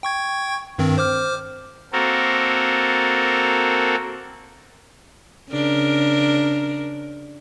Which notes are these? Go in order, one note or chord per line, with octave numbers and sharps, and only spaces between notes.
G5 C#6 G#6
G2 D#3 C4
C5 D6 F6
A#3 C4 F#4 A4 A#4
C#3 D4 A#4